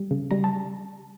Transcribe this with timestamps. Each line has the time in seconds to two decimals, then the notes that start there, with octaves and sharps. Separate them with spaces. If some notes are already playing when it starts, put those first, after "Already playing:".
Already playing: G3
0.11 C#3
0.31 G3 A#5
0.44 A5